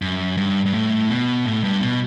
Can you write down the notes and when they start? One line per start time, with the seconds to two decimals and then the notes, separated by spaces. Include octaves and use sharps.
0.02 F#2
0.37 G2
0.65 G2
0.74 A2
1.09 B2
1.46 A2
1.64 G2
1.81 B2